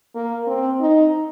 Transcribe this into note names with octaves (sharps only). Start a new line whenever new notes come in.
A#3
C4
D#4